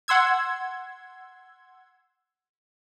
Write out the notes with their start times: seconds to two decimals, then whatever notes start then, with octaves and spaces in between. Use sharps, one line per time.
0.08 F#5 C6 E6 G#6